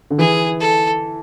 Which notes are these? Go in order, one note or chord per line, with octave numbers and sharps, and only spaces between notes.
D3
E3 G#4
A4